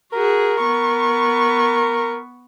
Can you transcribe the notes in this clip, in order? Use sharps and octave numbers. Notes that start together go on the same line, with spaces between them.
F#4 G#4 A#4
B3 C#6